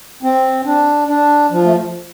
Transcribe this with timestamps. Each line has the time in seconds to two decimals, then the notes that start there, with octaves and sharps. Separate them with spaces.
0.23 C4
0.65 D4
1.08 D4
1.51 F3
1.64 A3